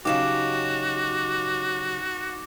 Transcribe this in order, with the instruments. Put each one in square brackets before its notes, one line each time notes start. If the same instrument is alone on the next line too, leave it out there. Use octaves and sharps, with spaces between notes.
[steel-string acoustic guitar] C#3 F#3 G4 [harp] D#4 F5 [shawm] F#4 [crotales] D6 E7